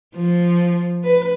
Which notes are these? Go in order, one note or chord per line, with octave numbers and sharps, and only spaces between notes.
F3
B4